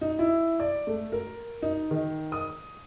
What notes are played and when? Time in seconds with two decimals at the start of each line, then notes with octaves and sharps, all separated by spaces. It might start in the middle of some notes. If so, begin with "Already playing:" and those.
0.01 D#4
0.19 E4
0.60 D5
0.87 A3
1.12 A#4
1.62 D#4
1.91 D#3
2.32 D#6